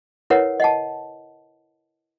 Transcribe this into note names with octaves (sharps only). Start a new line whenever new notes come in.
E4 A#4 B4 C#5 F#5
D#5 F#5 A5